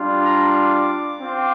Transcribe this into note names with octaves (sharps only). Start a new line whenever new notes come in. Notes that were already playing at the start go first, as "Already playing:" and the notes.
Already playing: G3 D4 F4
A#5
D6
C4 F4